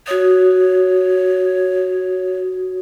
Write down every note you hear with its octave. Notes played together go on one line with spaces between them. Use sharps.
F#4 C#5 D#6